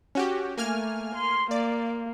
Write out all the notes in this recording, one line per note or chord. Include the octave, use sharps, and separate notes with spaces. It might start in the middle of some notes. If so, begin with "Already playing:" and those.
C#4 F#4 G4
A3 A#3 G#5 F6
C6
A#3 D5